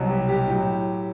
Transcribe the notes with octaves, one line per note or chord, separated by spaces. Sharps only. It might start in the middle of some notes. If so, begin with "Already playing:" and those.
Already playing: C2 B2 F#3
G4
G4
A2 F#3